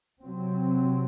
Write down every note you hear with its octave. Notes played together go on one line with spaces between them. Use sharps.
C3 F#3 C4